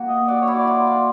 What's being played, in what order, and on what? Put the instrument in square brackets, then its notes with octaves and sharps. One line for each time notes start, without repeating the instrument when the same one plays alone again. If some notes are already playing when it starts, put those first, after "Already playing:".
Already playing: [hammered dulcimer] A#3 F#4
[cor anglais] D#5
[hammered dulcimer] F#4 [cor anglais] D5
[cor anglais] C#5
[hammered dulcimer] E4
[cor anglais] D5
[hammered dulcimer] F4
F4